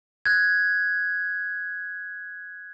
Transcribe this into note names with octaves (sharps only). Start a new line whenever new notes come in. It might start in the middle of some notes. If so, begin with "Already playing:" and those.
F#6 G#6